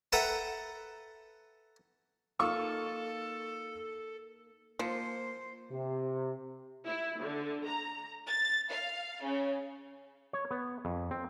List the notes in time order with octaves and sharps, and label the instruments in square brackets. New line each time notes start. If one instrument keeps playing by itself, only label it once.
[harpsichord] A4 B4 E5 F#5 G5 A#5
[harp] A#3 D#4 A#4 [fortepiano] F4 C#6 E6 [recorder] A4
[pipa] F3 [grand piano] A#3 C#7 [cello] C5
[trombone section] C3
[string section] E4
D3
A#5
A6
F5
C#3
[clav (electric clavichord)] C#5
B3
F2
C4